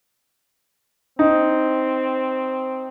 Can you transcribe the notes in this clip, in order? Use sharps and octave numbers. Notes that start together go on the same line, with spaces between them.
C4 D#4